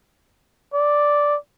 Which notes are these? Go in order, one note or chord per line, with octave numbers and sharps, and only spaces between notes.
D5